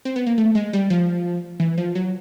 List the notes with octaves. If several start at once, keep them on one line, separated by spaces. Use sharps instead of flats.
C4
B3
A#3
A3
G#3
G3
F3
E3
F3
F#3